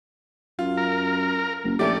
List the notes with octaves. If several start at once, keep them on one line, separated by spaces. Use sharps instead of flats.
F#2 F4
A#4
F#1
A#1 A3 C#4 G4 D5